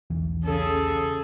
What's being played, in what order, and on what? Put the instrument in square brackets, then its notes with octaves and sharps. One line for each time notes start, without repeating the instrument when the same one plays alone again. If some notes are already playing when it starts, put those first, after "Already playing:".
[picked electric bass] B1 E2 E3
[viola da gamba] C#3 G#4 [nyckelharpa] A4